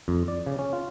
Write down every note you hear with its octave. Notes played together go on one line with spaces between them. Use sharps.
F2
D5
C#3
C#4
F4